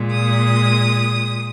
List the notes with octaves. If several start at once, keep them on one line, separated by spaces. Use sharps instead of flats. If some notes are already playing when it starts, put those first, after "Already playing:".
Already playing: A#2 G#3
D#6